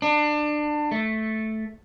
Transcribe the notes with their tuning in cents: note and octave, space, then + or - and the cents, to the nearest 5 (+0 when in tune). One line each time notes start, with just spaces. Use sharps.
D4 +25
A3 -5